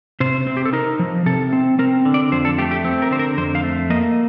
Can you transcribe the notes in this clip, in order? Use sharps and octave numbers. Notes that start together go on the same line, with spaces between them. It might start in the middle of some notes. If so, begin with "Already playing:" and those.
C3 C5
C4
G4
A4
D#4 A#4
F3
C3 A4
C4
C4 A#4
D3
D5
F2 C5
A4
A3 G4
G4
C4
A#4
D3 C5
A#4
F2 C5
F5
A3
A#3 D#5